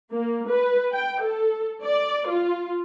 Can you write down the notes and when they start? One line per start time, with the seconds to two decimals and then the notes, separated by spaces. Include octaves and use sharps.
0.12 A#3
0.47 B4
0.93 G5
1.22 A4
1.83 D5
2.27 F4